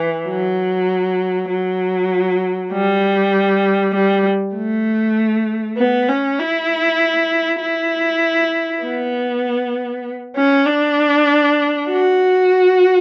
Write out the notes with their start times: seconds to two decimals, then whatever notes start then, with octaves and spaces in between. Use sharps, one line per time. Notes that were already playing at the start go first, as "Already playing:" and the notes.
Already playing: E3
0.28 F#3
1.50 F#3
2.72 G3
3.95 G3
4.55 A3
5.77 B3
6.08 C#4
6.39 E4
7.61 E4
8.83 B3
10.36 C#4
10.66 D4
11.89 F#4